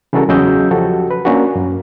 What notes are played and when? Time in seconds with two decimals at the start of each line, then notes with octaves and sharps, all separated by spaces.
0.13 C#3 E3 G3 F#4 A4 A#4
0.29 E2 C#3 F#3 D#5 E6 G6
0.71 F3 F#4 G4 A4
1.11 B4
1.25 A#3 C#4 D4 F#4
1.56 F#2